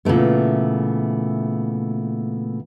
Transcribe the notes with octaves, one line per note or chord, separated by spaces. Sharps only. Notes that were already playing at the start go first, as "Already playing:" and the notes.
A#2 C#3 E3 A3 B3